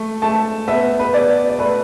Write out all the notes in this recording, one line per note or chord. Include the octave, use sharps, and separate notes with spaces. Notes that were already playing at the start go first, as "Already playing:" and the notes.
Already playing: A3
A3 A5
B3 E5
B4
B3 D5
D5
A3 B4